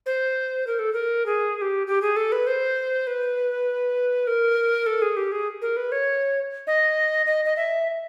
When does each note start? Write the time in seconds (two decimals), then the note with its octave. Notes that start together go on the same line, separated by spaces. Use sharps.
0.06 C5
0.67 A#4
0.79 A4
0.93 A#4
1.26 G#4
1.57 G#4
1.62 G4
1.87 G4
2.02 G#4
2.16 A4
2.32 B4
2.47 C5
3.07 B4
4.27 A#4
4.86 A4
5.02 G#4
5.17 G4
5.32 G#4
5.62 A#4
5.77 B4
5.92 C#5
6.67 D#5
7.26 D#5
7.45 D#5
7.56 E5